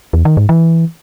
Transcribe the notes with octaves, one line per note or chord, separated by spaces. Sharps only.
E2
D#3
G#2
E3